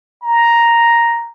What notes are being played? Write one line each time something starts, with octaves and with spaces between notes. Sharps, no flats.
A#5